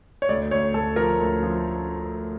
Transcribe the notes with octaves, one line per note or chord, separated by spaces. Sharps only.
C#5
D2 D5
D2 C#5
D2 A4
F3 A#4
D2
F3